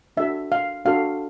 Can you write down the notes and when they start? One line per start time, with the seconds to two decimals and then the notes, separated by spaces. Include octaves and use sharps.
0.17 D4 F#4 A4 E5
0.52 F5
0.85 D4 F#4 A4 F5